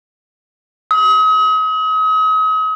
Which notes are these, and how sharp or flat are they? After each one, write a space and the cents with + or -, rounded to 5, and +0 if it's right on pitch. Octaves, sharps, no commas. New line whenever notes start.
D#6 +40